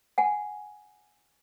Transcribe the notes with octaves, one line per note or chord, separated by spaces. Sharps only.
F#5 G#5